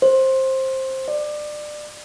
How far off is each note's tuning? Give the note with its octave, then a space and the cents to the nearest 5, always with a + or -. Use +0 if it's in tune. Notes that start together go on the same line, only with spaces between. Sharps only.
C5 +15
D5 +25